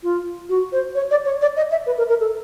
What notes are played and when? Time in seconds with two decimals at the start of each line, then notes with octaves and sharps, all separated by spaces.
0.03 F4
0.49 F#4
0.72 C5
0.95 C#5
1.11 D5
1.25 C#5
1.41 D5
1.56 D#5
1.71 E5
1.86 B4
1.98 A#4
2.09 A#4
2.20 A4